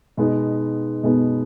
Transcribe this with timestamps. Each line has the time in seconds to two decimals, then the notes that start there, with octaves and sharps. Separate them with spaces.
0.17 B2 G#3 B3 D#4
1.03 B2 G#3 B3 D#4